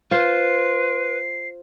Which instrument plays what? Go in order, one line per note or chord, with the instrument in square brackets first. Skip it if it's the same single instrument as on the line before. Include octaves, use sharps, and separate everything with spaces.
[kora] F4 [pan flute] B4 [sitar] C5 [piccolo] C7